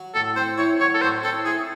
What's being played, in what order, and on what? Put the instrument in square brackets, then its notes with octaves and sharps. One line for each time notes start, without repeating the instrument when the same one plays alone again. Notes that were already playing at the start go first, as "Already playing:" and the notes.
Already playing: [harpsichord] F#3
[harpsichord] A2 [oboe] A4
[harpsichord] C4 [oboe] C5
[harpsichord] E4 [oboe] C#5
[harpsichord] F#3 [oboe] C#5
[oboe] A4
[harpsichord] A2 [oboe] C5
[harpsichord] C4 [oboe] A4
[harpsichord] E4 [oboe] G#4